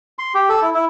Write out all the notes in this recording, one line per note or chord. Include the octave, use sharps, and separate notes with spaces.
C6
G4
A4
E4
E4